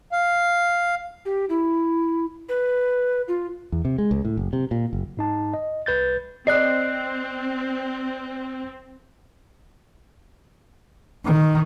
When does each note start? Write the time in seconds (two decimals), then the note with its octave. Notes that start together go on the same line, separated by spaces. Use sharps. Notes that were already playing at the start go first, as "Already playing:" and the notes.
0.12 F5
1.25 G4
1.49 E4
2.49 B4
3.28 F4
3.72 E2
3.85 C3
3.98 G#3
4.11 C#2
4.25 A2
4.37 F#1
4.53 C3
4.71 A#2
4.93 F#1
5.17 G#2 D#4 A5
5.54 D#5
5.86 C2 B4 G6 A6
6.47 C4 D5 D#5 F#6 C7
11.25 D#3